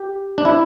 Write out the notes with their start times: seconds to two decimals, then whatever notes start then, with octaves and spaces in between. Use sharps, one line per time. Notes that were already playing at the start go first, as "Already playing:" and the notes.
Already playing: G4
0.38 D4
0.45 E4